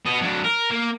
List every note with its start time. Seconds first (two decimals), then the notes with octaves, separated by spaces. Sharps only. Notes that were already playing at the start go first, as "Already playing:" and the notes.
0.06 B3 D#5
0.22 F#3 D4
0.44 A#4
0.71 A#3